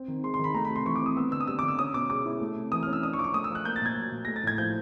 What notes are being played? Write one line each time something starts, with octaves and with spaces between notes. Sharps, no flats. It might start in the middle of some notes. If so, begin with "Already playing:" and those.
Already playing: C4
D#3
G#3 C6
C6
D#3 B5
A3 A#5
B5
C3
C6
E3 C#6
D6
C4
D#6
B3 E6
D3 E6
D#6
G3 E6
D6
D3
E6
C#4 D#6
B2 D6
G#3 D6
E4
A3
C3
E3 D#6
F6
C#4
E6
D4 D#6
C#6
F3 D6
C#6
A3 D#6
E6
F3
F#6
A#3 G6
A6
A#2 G#6
F#3
A#2
A3 A#6
A6
A2 G#6
F3 G6